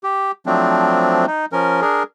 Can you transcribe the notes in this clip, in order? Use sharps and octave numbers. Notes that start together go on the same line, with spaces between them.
G4
F3 F#3 A3 C4 D4
D#4
F3 C#4 A#4
D4 G#4 A#4